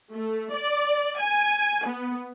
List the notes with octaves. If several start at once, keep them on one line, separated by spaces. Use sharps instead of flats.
A3
D5
G#5
B3